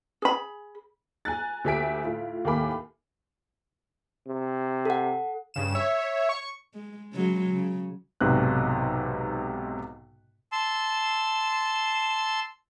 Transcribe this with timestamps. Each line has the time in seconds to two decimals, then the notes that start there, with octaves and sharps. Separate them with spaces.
0.22 G#4 B5
1.25 G#5 A#5 F#6 A6
1.64 D2 G4 E5 G#5 B6 D7
2.04 A2 F4
2.45 D#2 A2 A#3 G#5 B5 D6
4.28 C3
4.85 A4 F#5
5.54 G2 C#3 E7
5.75 C#5 E5
6.29 C#6
6.74 G#3
7.14 C#3 F#3 G#3
7.51 C#3
8.21 B1 G#2 C3 B3 F#6
10.52 A5 C6 E6